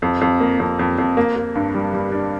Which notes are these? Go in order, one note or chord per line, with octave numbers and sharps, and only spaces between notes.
F2
F2
A#3
F2
F2
F2
A#3
A#3
G2
G3
G3
D4